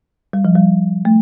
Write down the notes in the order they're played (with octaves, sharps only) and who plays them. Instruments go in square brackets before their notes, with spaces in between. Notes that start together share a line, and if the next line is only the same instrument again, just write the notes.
[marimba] G3
F3
G3
A3